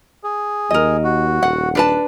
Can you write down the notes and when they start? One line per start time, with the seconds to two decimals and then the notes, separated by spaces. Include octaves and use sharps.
0.24 G#4
0.70 D#2 A#4 D#5
1.04 F#4
1.43 D#1 F#5
1.75 D4 B4 A5